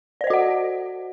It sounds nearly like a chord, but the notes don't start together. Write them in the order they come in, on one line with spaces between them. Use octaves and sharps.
D5 C5 D#5 F#4 F#5